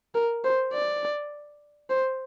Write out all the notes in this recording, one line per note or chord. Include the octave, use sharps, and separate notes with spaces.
A#4
C5
D5
C5